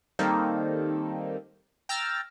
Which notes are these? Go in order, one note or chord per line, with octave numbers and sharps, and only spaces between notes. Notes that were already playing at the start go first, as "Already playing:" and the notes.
D#3 G3 A#3 C4 D#4 A4
G5 A#5 E6 F6 A6